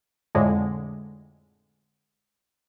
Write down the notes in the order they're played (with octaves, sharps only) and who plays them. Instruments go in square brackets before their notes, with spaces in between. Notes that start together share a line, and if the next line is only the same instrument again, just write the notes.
[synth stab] F2 A2 D3 G#3